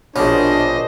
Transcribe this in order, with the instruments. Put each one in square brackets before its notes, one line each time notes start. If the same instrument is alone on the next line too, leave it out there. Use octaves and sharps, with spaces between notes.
[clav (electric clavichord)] A#1 B2 [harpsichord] C#4 [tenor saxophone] D4 [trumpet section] C5 D#5